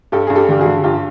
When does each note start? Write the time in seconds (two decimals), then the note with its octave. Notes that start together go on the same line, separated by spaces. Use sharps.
0.12 G2 G4 A4
0.27 G2 G#4
0.36 G4 A4
0.49 D3 G4
0.60 F#4 G#4
0.66 D3
0.84 G2 F4 G4